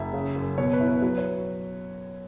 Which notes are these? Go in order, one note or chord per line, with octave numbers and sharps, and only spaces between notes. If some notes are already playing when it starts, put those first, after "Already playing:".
Already playing: F#1 E5
C#3
F#2
B2 C#5
B4
E4
B4
F#3 B4
C#5